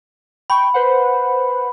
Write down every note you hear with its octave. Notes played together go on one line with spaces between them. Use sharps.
G5 B5 C#6
B4 C5 F#5